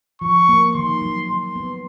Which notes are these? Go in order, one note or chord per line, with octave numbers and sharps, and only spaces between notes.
F3 C#6
A#3
D#3 C6
F#3
F#3 C6
B3